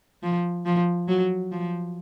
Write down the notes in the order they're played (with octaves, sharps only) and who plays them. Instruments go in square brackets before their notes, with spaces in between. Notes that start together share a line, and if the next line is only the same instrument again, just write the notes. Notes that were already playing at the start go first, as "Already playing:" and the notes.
[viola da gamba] F3
F3
F#3
F3